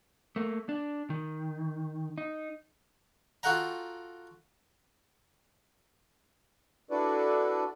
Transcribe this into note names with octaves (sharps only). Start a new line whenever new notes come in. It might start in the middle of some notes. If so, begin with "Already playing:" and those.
A3 A#3
D4
D#3
D#4
F4 F#4 A4 F#5 G5 A#5
D4 E4 F#4 A4 B4 D5